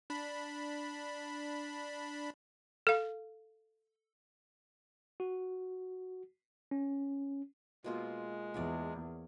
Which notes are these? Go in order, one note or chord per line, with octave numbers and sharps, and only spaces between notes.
D4 B5
A4 F5
F#4
C#4
B2 G#3 A#3 F4
E2 A#4 C#5 D5